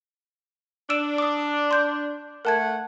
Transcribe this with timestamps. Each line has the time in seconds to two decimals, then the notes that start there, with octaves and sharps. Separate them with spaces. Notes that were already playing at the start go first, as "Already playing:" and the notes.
0.90 D4 E6 D7 E7
1.18 D6 D#6
1.71 C6 G6
2.45 A3 A#4 F#5 A5 G#6